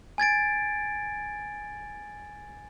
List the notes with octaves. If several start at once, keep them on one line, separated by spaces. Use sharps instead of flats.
G#5 G#6 A6 D7